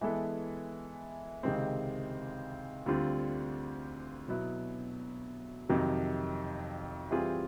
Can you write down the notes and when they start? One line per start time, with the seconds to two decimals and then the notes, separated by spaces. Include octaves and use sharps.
0.01 E3 G#3 B3 E4 A4
1.43 C#2 C3 D#3 G#3 C4
2.86 D2 D3 G3 C4 F4
4.27 B2 F#3 B3 E4
5.69 F2 C3 D#3 F#3
7.11 E3 G3 C4 F4 G#4